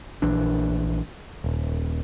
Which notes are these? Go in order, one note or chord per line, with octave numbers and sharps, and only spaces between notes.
A#1 E3 D4
D#1